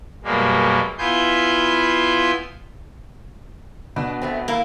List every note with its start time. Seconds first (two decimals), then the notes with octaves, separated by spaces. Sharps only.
0.24 F#2 B2 G3 G#3 A#3
0.98 B3 E4 F4 G#5 C6 G6
3.96 B2 D4
4.22 A3 B3 C4
4.48 E2 A#3 E4